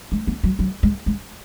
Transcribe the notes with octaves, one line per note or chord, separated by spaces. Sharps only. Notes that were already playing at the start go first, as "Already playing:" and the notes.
G#3
B3
F#3
F#3
G#3
G#3